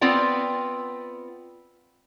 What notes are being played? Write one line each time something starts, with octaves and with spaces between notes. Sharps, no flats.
B3 C4 F4 D5 G5